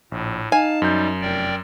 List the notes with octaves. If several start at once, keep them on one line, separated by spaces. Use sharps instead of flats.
A#1 A2
D#4 F5 G#5 A5
F#2 G3 G6
F1 A#4 D5 G5